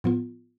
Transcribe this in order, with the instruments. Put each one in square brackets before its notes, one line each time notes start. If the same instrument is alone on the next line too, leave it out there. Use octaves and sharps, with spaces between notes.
[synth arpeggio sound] A2 F3 B3 F4